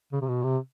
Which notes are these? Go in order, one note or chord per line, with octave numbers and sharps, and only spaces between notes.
C#3
C3
B2
C3